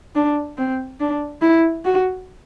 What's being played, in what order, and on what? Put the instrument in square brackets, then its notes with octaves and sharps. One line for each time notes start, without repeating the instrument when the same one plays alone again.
[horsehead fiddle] D4
C4
D4
E4
F#4